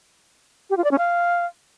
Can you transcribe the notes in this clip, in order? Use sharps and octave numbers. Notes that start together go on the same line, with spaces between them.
G4
F4
D5
C#4
F5